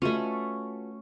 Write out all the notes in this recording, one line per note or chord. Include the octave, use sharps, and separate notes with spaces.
A3 C#4 F4 F#4 B4